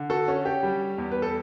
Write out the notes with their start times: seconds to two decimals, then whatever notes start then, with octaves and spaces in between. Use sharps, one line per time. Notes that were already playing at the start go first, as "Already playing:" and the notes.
Already playing: D3
0.10 F#4 A4
0.28 C#4
0.45 G4
0.63 G3
0.98 E2
1.11 B4
1.22 A4